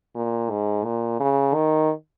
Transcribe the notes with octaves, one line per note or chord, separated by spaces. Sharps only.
A#2
G#2
A#2
C#3
D#3